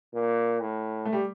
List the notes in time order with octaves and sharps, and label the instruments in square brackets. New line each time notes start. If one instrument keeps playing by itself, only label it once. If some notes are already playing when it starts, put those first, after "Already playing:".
[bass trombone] A#2
A2
[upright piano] A3
G3